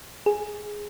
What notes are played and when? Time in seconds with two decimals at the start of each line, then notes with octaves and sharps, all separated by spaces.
0.26 G#4